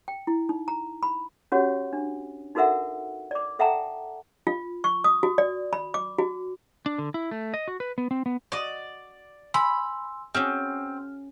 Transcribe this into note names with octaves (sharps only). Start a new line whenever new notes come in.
G5
E4
D#4
A#5
B5
C#4 F#4 G4 C#5 F#5
D4
D#4 F#4 A4 A#4 E5 F#5
D5 D6
A4 E5 F#5 G5 A5 A#5
F4
C#6
D#6
F#4
D5
B5
D6
F#4
D4
D3
E4
A3
D#5
F#4
B4
B3
C4
B3
F#4 D5 D#5
G#5 B5 C6 E6
C4 C#4 F#4 G#4 F6